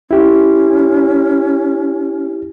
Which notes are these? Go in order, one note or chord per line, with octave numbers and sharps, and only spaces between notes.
C#4 E4 G4